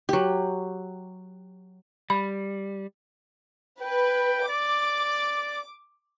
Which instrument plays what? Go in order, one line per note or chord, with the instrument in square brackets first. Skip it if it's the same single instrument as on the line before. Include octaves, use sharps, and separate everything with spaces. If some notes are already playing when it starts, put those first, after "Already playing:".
[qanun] F#3 G4
[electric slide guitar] G3 [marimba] B5
[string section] B4 [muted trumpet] G5
[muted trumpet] D5 [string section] D6